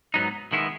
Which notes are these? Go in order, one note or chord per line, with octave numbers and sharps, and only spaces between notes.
G#2 F#3 B3 D#4
D#3 G#3 B3 E4